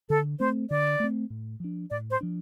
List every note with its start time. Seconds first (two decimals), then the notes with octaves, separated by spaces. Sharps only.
0.09 D3 A4
0.40 A3 C4 C5
0.70 D3 D5
1.00 A3 C4
1.30 A2
1.60 F3 D4
1.90 A2 D5
2.10 C5
2.21 F3 D4